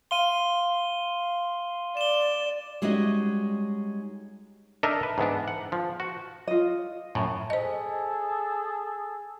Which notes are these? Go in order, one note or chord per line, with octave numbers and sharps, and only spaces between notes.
F5 C6 D#7 G7
D5 E7 G7
G3 G#3 C#4 D#4 F#4 D#5
D4 D#4 A4 A#4 D#5 E5
B4
G#2 E3 B3 D4
F#5
F3
F#4
F4 D#5
F#2 A2
G#4 A4 C5 D#5